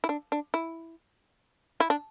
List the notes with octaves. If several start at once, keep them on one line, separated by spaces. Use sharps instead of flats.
E4
D4
D4
E4
E4
D4